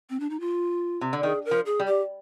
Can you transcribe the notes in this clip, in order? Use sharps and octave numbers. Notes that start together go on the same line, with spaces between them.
C4
D4
D#4
F4
C3
D3
D#3 G#4
A#4
F3
G#4
G3
G4